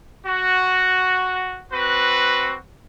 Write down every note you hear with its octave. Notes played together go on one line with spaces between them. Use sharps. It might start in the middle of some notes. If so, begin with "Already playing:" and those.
F#4
C4 F#4 B4